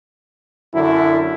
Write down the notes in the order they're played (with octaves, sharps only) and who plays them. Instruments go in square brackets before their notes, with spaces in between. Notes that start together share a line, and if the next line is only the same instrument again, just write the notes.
[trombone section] F#2 D3 E4